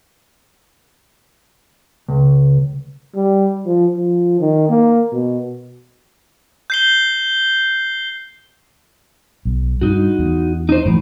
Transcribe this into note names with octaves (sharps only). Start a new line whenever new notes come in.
C#2
G3
F3
F3
D#3
A#3
B2
G6 C7 G7
B1
G2 D#4 F#4
E2
D#4 C5
F#2 A2 E3 F3